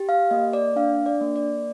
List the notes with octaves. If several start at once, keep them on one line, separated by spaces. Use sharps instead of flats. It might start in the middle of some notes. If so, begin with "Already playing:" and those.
Already playing: G4
F5
A#3 D#5
D5
D4 F5
D5
A#3
D5